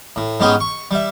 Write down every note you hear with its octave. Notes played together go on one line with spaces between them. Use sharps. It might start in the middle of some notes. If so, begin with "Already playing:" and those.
A2
G#2 G#3 B3 C#4 G4 G#4
C#6
G3 E5